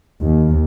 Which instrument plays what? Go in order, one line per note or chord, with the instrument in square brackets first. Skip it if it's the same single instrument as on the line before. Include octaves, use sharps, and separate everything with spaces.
[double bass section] D#2